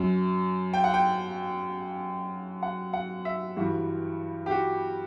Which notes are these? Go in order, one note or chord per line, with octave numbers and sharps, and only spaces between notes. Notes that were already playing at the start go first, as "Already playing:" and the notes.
Already playing: F#2 F#3
G5
F#5
G5
F#5
F#5
E5
G2 E3 G3 F#4
G4
F#4